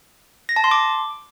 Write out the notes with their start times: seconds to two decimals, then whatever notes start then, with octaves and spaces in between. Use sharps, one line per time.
0.49 A#6
0.56 A5
0.64 C6
0.71 D6